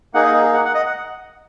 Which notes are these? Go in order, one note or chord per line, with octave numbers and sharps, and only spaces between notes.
A#3 D#4 G#4 F#5
D#5
G#4
G#4
F#5
F#5
D#5
F#5